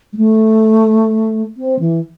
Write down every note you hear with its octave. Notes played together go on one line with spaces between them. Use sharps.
G#3
A3
C4
E3